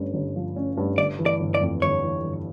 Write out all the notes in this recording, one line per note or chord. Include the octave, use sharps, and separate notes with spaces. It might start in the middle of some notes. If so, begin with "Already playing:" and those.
Already playing: G1 G2 C#4
G1
F3
C#4
G2
G1 D5
E3
D5
G1
D5
F2
G1 C#5
E3
G1